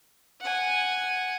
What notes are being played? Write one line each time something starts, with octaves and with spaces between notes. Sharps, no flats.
F#5 G#5